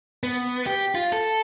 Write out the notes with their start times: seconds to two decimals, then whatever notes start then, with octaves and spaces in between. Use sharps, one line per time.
0.23 B3
0.66 G4
0.95 F4
1.13 A4